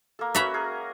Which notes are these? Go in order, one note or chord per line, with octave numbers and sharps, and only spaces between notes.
A#3 A4
C#4 F#4 E5 A#5 B5
G#4 A#4